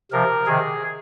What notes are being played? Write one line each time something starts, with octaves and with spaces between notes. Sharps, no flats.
C3 F3 A#4
C3 D#3 G#4